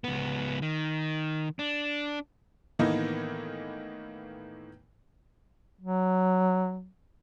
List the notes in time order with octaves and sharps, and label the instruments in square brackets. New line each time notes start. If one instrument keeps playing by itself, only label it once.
[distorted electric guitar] C#2 B3
D#3
D4
[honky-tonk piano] A2 D#3 E3 A#3 B3 D#4
[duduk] F#3